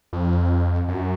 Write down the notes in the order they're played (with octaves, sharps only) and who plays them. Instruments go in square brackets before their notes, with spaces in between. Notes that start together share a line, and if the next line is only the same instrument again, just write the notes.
[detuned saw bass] F2
F#2